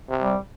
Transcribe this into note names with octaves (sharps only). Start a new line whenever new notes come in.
C3
G3